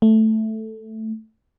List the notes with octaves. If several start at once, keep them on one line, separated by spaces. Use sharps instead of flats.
A3